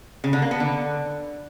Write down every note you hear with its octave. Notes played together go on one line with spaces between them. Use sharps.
C#3
D3
A#3
B3
D3